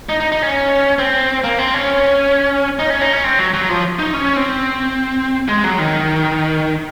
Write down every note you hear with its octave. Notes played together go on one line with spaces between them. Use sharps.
D#4
D#4
D#4
C#4
C4
A#3
C4
C#4
D#4
C#4
D#4
C#4
C4
F#3
F#3
F3
D#4
C#4
C4
G#3
F#3
D#3